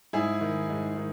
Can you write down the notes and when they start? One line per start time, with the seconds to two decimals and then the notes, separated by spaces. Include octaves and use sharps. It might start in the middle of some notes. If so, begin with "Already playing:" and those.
0.13 G#2 E4 G#4
0.41 D#3
0.70 G#2
0.97 D#3